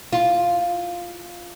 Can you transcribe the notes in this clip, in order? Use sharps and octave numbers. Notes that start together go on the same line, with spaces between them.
F4